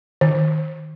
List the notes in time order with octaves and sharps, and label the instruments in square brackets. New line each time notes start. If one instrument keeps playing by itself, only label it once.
[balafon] D#3